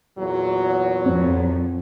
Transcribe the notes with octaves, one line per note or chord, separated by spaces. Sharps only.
E2 A#2 F#3
F2 C4